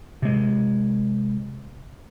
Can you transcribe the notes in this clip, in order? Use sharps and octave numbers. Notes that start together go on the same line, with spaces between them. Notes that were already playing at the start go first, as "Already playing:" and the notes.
C3 G#3